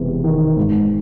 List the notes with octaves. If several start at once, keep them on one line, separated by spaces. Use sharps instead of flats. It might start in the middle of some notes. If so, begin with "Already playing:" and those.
Already playing: E1 E2 C3
D#3
G#2